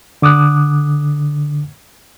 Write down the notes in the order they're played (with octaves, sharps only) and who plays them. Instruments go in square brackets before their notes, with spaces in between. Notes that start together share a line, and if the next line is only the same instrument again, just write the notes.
[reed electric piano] D3 D6 D#6 F#6